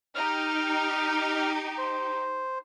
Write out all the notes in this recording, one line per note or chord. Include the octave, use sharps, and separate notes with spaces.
D#4 G4 F6
C5